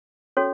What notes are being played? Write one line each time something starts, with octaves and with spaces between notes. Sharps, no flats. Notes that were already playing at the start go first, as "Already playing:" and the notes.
C#4 F#4 A4 C#5